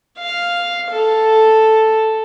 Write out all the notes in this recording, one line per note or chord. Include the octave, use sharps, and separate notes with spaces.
F5
A4